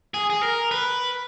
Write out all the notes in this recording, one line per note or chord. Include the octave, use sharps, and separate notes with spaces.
G#4
G#4
A#4
B4